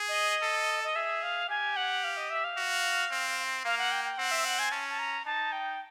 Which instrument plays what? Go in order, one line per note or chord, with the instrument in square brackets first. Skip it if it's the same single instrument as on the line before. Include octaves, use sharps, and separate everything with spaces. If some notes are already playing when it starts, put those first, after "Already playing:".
Already playing: [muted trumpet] G#4
[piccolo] D#5
[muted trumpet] A4
[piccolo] D#5
[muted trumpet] G#4 [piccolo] E5
[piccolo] F5
[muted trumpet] G4 [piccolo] G#5
[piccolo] F#5
F5
D#5
E5
F5
[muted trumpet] F#4
C4
[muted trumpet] A#3 [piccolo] F5
[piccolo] F#5
G5
G5
[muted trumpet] C4 [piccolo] F#5
[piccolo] E5
F#5
G#5
[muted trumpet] C#4 [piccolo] A5
[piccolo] A5
A#5
[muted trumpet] D#4 [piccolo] A5
[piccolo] G5